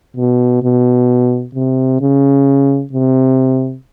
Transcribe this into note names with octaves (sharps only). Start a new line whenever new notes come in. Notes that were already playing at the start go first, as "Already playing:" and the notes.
B2
B2
C3
C#3
C3